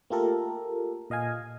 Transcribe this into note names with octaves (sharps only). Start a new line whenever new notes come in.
A3 A#3 F4 G4 A4 A#4
A#2 D#5 F5 G#5